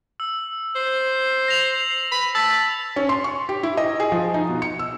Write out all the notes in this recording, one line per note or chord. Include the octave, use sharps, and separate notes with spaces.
E6
C5
A#6 F7 F#7
B5
A5 E6 A6 B6
C#4
C6
C#6
G4
E4
D#5
G#4
F3
D#4
B2
C#7
E6